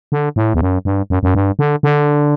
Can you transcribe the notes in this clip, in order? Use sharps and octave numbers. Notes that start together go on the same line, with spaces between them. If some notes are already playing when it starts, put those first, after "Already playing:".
D3
A2
E2
F#2
G2
F#2
F#2
G2
D3
D3